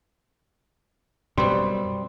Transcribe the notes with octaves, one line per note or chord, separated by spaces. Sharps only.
F#2 B2 G3 C4 C6